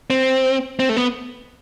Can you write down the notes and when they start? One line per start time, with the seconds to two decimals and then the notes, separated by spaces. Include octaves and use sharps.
0.10 C4
0.79 C4
0.89 A3
0.97 B3